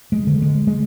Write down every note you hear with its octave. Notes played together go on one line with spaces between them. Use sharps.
G#3
D3
G#3
G#3